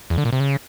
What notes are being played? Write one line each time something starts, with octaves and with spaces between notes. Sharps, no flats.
E2
D3
A#2
C3
C#3